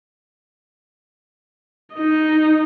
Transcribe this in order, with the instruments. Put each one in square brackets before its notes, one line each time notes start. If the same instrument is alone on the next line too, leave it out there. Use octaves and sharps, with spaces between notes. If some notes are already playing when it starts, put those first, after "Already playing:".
[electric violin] D#4 D#5